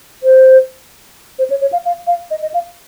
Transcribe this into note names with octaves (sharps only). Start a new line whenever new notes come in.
C5
C5
C#5
C#5
F5
F5
F5
D#5
D#5
F5